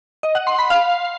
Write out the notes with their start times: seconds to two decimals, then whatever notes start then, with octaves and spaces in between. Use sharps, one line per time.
0.23 D#5
0.35 F#5
0.47 C6
0.59 B5
0.70 F5